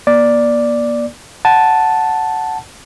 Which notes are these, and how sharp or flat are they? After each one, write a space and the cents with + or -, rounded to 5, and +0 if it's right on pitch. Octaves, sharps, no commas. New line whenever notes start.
A#3 +40 D5 +0
F#5 +0 A5 +0